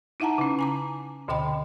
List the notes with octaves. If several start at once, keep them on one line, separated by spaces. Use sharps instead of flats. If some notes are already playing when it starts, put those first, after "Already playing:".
D#4 E4 E5 F#5 A5 A#5
C#3 C#4
G#5 A#5 D6
D2 B2 D3 D#5 G5 B5